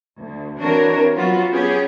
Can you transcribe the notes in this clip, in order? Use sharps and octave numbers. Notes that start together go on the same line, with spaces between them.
D2
E3 C4 D4 F#4 A#4 C#5
F#3 B3 F4 F#4
B3 C#4 G4 G#4